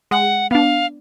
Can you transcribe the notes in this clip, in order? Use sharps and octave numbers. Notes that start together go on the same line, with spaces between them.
G#3 F#5
B3 D4 F5